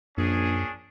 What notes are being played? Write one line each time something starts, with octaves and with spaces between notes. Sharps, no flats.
A#1 F#2 C#4 D4 G#4